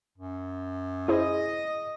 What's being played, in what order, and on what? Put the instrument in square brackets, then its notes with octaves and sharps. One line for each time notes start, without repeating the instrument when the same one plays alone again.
[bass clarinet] F#2
[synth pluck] E4 G#4 C5 [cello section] D#5